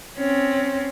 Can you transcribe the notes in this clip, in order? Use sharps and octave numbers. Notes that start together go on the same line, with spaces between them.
C4 C#4